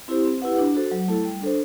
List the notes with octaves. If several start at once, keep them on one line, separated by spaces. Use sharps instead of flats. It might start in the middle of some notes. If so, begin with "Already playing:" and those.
C4 E4 G4 C5
C4
E4 G4 B4 F#5
D4
F#4 A4 C5
F#3
A3 E4 A4
G3
D4 A4 C5